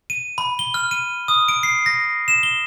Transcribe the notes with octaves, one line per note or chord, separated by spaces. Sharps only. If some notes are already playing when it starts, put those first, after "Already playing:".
D#7
B5
G7
F6
D#7
D#6
D7
C7
A#6
E7
G7